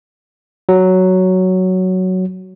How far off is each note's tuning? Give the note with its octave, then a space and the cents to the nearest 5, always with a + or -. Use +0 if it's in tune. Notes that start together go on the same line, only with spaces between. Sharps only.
F#3 +5